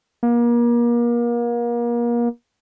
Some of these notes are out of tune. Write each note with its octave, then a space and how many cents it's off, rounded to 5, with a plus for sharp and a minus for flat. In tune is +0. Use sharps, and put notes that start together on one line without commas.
A#3 +35